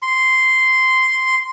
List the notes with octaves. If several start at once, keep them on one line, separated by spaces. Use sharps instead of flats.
C6